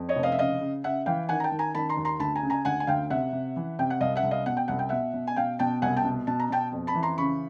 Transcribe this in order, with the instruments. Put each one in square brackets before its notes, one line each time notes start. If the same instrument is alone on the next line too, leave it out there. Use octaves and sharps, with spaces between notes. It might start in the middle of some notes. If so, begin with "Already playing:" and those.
Already playing: [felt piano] F2
C#5 D#5
F1
D#5 F5
E5
C#3 D#5 F5
C#3
C#3 E5 F#5
E3 F5 G5
D#3 F#5 G#5
A#5
G5 A5
D#3
G#5 A#5
D#3 A5 B5
A#5 C6
D#2
A#5 C6
D2 A5 B5
G#5 A#5
C#3
G#5 A#5
D2 F#5 G#5
G#5
D2 F5 G5
C3 E5 F#5
C3
E3
C3 G5
F#5
C2 D#5 F5
E5 F#5
C2
D#5 F5
B2 F#5
G5
C2 F#5
G5
B2 E5 F#5
B2
G#5
B2 F5 G5
B2 G5 A5
C2 F#5 G#5
G5 A5
B2
B2 A5
A#5
B2 G5 A5
F2
A5 B5
E3
A#5 C6
C#3 B5 C#6